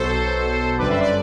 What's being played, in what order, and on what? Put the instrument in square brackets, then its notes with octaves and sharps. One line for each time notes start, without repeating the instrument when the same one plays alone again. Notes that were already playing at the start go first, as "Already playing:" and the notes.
Already playing: [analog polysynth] B1 B2 F#3 A4 C5
G1 F#2 D3 G3 B4 D5
C5 E5
B4 D5